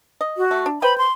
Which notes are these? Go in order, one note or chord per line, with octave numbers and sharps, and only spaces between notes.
D#5
F#4
A3
D4
B4 C5 G5 B5
C6